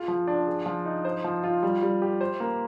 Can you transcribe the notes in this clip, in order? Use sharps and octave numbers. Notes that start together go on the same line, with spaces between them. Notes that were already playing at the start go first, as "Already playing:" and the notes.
Already playing: F4 G#4
F3
D4
G#4
F3
D#4
C5
F3
F4
G3
G3
G4
C5
A#3